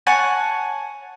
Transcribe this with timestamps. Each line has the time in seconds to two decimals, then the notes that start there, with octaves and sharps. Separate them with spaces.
0.07 C#5 F#5 G#5 A5